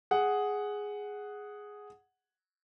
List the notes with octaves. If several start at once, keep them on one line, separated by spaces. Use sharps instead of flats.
G#4 F#5